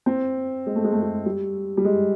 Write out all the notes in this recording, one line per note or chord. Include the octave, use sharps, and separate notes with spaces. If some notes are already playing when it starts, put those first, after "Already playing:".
C4
G#3
A3
G#3
A3
G#3
G3
G3
G#3